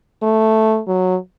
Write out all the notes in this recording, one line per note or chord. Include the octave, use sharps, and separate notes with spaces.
A3
F#3